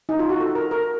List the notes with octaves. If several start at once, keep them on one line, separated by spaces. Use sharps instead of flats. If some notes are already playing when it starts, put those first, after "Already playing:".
D#4
F4
F#4
A4
A#4
A#4